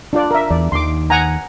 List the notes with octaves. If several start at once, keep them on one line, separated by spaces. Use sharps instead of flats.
D4 F4 D5
A#4 E5
E2 D5
D#2 D#3 C6 D6
F#5 G#5 A#5